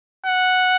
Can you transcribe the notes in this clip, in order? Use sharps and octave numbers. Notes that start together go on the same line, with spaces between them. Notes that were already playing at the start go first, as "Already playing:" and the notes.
F#5